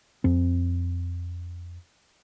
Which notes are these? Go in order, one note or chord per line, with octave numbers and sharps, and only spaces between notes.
F2 C4